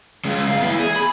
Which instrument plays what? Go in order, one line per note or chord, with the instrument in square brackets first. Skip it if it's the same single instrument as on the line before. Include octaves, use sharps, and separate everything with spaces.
[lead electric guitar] C#3 G#3
F#2 F5
B3 E4
G#4
B5